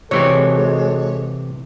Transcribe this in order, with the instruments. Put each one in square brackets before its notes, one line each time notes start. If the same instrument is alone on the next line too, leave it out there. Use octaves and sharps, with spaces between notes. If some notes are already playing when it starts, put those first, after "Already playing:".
[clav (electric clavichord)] C3 E3 C4 [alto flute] G#3 [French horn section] F#4 A4 [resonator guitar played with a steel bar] C#5